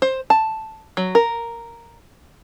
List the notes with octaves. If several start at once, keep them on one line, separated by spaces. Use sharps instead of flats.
C5
A5
F#3
A#4